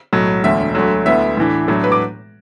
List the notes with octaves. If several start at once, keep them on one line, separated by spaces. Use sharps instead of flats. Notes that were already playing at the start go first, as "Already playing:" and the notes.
B1 A2 F#3
E1 D2 D3 E5
D2 D3 F#3
D2 D3 B3 E4 E5
A2 E3 D4
A2 F#3 A3 D4
B4
D6